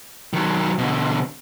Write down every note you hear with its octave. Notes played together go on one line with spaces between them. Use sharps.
D#3 F#3
B2 D3